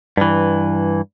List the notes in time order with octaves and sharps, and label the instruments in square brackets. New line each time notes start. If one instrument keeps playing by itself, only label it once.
[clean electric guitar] G2 E3